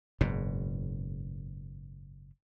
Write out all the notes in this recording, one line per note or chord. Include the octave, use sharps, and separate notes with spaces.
F#1 G#2 B2